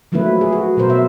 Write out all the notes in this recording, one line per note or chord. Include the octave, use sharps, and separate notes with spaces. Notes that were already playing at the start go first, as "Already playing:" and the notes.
F3 F#3 A3 A#3 E4 B4
G#4
F#4
B2 F#3 A#4 C5
E5